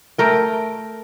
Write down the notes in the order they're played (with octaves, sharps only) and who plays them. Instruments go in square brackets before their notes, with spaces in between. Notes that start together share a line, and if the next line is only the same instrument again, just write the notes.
[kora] A3 A#4 G5